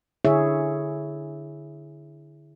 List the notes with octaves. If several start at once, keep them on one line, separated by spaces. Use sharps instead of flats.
D3 E4 G#4 C#5 E5